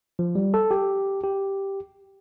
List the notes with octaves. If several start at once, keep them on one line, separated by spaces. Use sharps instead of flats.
F3
G3
A4
G4
G4